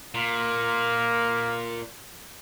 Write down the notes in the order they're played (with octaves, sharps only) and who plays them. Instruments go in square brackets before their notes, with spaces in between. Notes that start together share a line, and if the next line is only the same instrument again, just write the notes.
[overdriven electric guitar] A#2 [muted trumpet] A#3